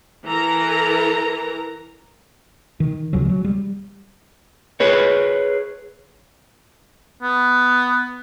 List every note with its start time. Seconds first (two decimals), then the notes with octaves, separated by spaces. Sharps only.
0.25 E3 A4 A#4 A#5
2.80 D#3
3.13 C#2 C#3 F3 F#3
3.25 F#3 G3
3.45 G3
4.80 G#4 B4 C#5
7.23 B3